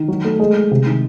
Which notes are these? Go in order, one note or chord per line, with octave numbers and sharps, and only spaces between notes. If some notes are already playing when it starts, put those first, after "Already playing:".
Already playing: D#3
F#3
A3
G#3
G#3
C3
D#3